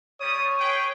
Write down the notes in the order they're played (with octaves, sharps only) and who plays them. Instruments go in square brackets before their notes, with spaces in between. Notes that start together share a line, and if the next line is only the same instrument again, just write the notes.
[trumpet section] G3 D#6 [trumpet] C#5
[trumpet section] G#4 B4 G5